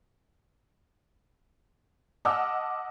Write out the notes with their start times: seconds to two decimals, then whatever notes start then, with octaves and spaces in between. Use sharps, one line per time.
2.25 D#5 F#5 A5 D6 E6 F6